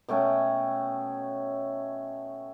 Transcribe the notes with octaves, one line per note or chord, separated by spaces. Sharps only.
B2 A3 C#4 G5